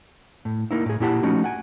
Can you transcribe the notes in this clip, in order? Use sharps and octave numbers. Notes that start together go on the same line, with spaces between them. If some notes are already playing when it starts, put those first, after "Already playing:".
A2
A#3 D#4 E4
A2 G#4
A#2 A#3 E4 G4 F#5 A5
F3 A3 C#4 D#4 F#4
F#5 G#5